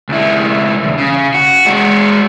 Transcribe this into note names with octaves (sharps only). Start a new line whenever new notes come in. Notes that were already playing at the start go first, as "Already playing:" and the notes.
C#2 E4
B1 E2
C#3
F#4
G#3 F#4